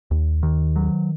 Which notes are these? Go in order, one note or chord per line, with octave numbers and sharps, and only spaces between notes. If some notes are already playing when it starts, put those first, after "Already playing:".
D#2
D#3
F#3